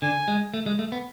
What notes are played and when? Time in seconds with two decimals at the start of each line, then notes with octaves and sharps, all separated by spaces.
0.02 D3 G#5
0.28 G#3
0.54 A3
0.66 G#3
0.79 A3
0.92 B3